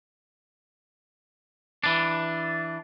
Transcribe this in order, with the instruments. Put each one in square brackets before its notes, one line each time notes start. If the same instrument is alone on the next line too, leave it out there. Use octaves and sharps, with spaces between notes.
[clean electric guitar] E3 D4